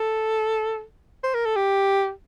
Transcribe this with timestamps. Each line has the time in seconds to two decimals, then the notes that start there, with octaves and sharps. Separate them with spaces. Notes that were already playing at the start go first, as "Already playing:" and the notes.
Already playing: A4
1.23 C5
1.34 A#4
1.45 A4
1.56 G4